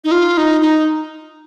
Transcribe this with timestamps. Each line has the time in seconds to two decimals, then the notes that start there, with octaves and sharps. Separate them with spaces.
0.04 D#4
0.11 F4
0.37 D#4
0.61 D#4